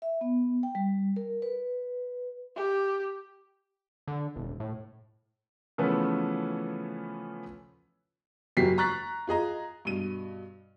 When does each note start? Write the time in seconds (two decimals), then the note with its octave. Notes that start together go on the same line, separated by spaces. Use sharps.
0.02 E5
0.21 B3
0.63 G5
0.75 G3
1.16 A#4
1.42 B4
2.56 G4
4.07 D3
4.36 E1
4.60 A2
5.78 C#3 E3 F3 A3 B3 C#4
8.57 F#1 F#3 F#4 G4 B6 C7
8.78 A#5 C#6 F#6 A6 B6
9.27 F4 G#4 D#5 A#5
9.85 G2 B2 D#7